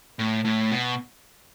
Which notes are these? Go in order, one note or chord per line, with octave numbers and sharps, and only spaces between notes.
A2
A2
B2